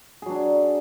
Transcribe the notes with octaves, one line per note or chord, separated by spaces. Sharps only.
F#3 D4 G#4